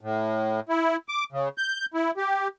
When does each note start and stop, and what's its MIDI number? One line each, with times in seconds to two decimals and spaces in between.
0.01 0.60 45
0.69 0.96 64
1.09 1.24 86
1.32 1.48 49
1.58 1.86 91
1.94 2.11 64
2.17 2.48 67